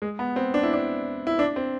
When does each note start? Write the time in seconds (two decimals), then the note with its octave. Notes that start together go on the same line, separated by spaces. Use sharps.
0.02 G#3
0.19 B3
0.36 C4
0.54 D4
0.63 E4
0.73 D4
1.27 E4
1.39 D4
1.56 C4